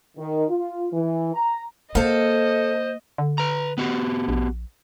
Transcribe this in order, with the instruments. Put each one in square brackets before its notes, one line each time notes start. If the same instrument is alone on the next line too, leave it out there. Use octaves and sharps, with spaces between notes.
[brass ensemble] D#3
F4
E3
A#5
[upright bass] A#3 [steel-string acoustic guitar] A4 F5 [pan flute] C5 [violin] D#5
[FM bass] D3
[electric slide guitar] B4 A#5
B3 F#4 G4
[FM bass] A#1